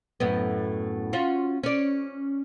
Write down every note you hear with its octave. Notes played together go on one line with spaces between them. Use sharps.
F#2 A2 B3
C#4 F4 F#4
C#4 D5